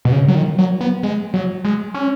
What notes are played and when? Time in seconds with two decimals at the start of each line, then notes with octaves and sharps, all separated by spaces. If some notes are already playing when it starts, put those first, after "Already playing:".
0.05 B2
0.12 C#3
0.28 F#3
0.35 D#3
0.58 F#3
0.81 B3
1.03 G#3
1.34 F#3
1.64 G#3
1.94 C#4